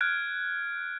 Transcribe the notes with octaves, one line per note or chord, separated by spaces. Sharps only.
F6 F#6 G#6 D7